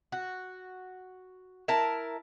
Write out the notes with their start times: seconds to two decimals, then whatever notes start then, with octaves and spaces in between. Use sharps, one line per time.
0.12 F#4
1.68 E4 A#4 A5